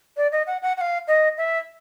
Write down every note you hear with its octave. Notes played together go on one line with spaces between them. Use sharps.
D5
D#5
F#5
F#5
F#5
F5
D#5
E5